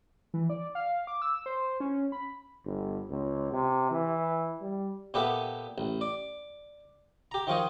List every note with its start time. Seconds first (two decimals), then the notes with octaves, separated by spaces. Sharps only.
0.34 E3
0.49 D5
0.75 F5
1.07 D6
1.22 E6
1.46 C5
1.80 C#4
2.12 B5
2.65 G1
3.10 C#2
3.52 C3
3.91 E3
4.62 G3
5.14 A#2 B3 G4 A4 B4 E5
5.78 A1
6.01 D5
7.31 G4 A#5
7.47 D#3 F3 F4 C#5 D#5